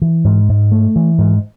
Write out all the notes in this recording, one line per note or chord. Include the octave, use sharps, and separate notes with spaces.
E3
G#2
G#2
A3
E3
G#2